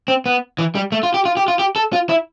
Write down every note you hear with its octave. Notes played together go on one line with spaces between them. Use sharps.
C4
B3
E3
G3
A3
F4
G4
F4
G4
F4
G4
A4
F4
E4